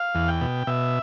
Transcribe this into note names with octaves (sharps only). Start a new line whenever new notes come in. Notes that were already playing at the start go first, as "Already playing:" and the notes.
Already playing: F5
E2
G5
B2
B2 E5